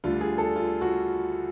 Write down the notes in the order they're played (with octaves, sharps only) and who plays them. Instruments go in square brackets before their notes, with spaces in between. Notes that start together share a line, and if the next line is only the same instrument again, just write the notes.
[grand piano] D2 D3 G3 F4
G#4
A4
F4
F#4